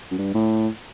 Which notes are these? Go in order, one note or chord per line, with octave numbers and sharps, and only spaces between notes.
F#2
G2
A2